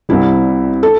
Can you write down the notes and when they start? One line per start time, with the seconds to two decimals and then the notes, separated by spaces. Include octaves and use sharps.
0.09 C2 C3 G3 E4
0.83 A4